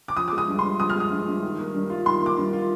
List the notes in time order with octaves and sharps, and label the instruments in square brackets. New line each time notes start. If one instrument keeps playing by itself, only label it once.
[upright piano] D6
F3 D#6
G#3 D6
D#6
G2
G2 C6
F3 D#6
F6
G#3 D#6
G2
G2
D#3
A#3
G2
F4
D#3 C6
A#3
D6
G2
F4